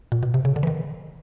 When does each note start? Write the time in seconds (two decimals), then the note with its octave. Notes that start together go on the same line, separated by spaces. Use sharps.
0.12 A#2
0.23 B2
0.34 C3
0.45 C#3
0.56 D3
0.63 E3
0.67 D#3